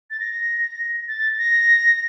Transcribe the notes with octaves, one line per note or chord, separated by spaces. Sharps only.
A6
A#6
A6
A#6